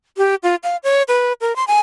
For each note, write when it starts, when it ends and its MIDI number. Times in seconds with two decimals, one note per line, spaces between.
0.17 0.35 67
0.43 0.55 65
0.63 0.77 77
0.84 1.03 73
1.08 1.33 71
1.41 1.55 70
1.56 1.64 84
1.68 1.79 80